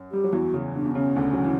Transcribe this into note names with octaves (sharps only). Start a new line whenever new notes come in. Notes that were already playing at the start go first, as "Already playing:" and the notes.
Already playing: F#2
G3 G4
F#3
E2 E3 F#4
C#3
B2 D4
B2
C#3 C#4
D2 D3
F#3
E3